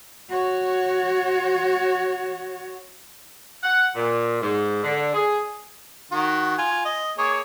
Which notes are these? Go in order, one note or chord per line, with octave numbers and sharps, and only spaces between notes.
F#4 C#5
F#5
A#2
G#2
D3
G#4
D#3 F#4
F4 G#5
D#5
A#3 G#4 C#5